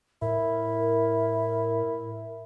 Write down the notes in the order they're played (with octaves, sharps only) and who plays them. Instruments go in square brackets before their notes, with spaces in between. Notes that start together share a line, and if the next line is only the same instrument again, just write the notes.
[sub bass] A2 [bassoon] E4 [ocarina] A#4